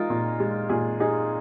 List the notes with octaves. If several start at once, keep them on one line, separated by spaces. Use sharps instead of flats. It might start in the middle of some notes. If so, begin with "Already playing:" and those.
Already playing: G#3 D#4 F4 A#4
A#2
G#3
A#2 G#4
D#4 G#4